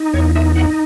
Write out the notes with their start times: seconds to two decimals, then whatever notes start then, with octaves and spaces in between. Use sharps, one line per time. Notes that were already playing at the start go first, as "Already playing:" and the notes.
Already playing: D#4
0.14 E2 C#5
0.35 D#4 E5
0.56 D#4 F#5